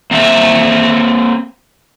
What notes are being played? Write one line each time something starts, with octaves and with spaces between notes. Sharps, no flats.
A#3 C4 E5